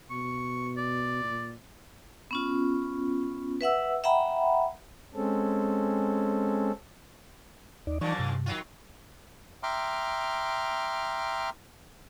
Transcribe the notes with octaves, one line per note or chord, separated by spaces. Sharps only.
B2 C#6
D5
A#2
B3 C#4 F4
B4 E5 F#5 E6
E5 F#5 G5 A#5 B5
G#3 C4 C#4 A4
D#2 D#4 D5
F#2 A#2 E3 F3 D#4 D5 C#6
G2 C3
D#3 F#3 F4
E5 G5 A#5 C6 D6 F6